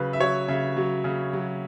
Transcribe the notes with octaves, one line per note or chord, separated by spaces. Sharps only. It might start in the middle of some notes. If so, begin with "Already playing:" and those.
Already playing: C#3 F#3 B4
E5
F#3 C#5
C#3 E5
F#3
C#3
F#3